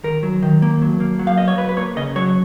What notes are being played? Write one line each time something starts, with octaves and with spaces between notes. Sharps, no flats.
D#3 A#4
F#3
D#3
A#3
F#3
A#3
F#3
F5
B3 D#5
C#5
F#3 B4
B4
A#3 C#5
C#3 D#5
F#3 C#5